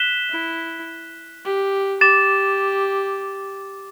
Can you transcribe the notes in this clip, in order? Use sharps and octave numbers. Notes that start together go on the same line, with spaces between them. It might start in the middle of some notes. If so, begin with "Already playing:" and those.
Already playing: F#6 B6 E7 G7
E4
G4
G4 D6 A6 E7